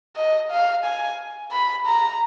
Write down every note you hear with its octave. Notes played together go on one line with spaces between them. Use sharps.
D#5
F5
G#5
B5
A#5